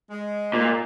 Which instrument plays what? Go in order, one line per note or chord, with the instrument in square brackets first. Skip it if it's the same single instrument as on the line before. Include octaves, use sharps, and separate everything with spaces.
[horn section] G#3
[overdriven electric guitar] A#2